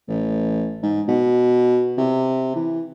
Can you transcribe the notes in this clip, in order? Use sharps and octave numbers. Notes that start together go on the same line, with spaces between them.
A1
G#2
B2
C3
E3